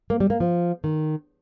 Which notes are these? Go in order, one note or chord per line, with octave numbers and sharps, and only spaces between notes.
A#3
G3
A#3
F3
D#3